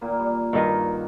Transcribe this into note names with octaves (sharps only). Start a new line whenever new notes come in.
A#2 D#3 A#3
G3
G2 D#3 A#3 F#4 A#4 D#5